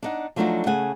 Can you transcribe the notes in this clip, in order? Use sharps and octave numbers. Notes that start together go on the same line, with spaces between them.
D4 D#4 F#5
F3 F#3 A3 D4 D#4 F#4
C#3 A3 F#5 G#5